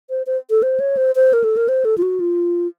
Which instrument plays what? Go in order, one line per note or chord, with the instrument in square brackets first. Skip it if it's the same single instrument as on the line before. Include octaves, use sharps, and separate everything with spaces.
[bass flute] C5
C5
A4
C5
C#5
C5
C5
A#4
A4
A#4
C5
A4
F4
F#4
F4